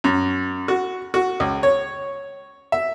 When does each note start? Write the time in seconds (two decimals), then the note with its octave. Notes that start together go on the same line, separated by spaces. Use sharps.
0.04 F#2
0.68 F#4
1.14 F#4
1.40 C#2
1.63 C#5
2.72 E5